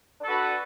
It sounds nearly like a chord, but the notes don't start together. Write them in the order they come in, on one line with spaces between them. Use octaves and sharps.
D4 A4 F#4 B4